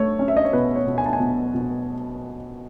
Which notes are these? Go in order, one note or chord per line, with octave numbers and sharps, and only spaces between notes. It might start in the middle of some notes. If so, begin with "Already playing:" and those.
Already playing: A3 C#5
C#4
E5
D#5
C#5
B2 B4
C#5
B2
G#5
A5
G#5
B2
B2